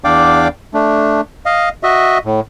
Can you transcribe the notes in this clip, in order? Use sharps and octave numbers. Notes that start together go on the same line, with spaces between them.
E2 D4 D5 F5 G5 D6
A3 D4
D#5 F5
F#4 D#5 E5
A2